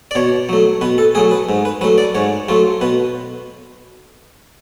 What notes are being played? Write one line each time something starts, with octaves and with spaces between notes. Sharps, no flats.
D5
B2 C#5
F#3 A3
B2 B4
A4
F#3 A3 G#4
B4
G#2
B4
F#3 A3 B4
D5
G#2 C#5
F#3 A3 F4
B2 B4